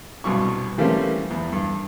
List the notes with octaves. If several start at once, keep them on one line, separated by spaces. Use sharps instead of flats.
C2 G2 B2 C#6
E3 G3 A3 A#3 C4 C#4
E2
G2